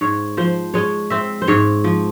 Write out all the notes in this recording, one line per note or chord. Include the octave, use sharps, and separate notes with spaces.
G#2 C#5
F3 C5
G#3 C#5
C4 E5
C5
G#2 C#5
F3